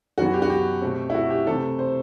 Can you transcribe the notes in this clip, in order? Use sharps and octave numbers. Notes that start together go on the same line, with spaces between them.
F#2 E3 B3 F#4
G4
F#4
G4
B2 A3 C4
E4
F#4
G4
C3 E3 A3 C4 A4
C5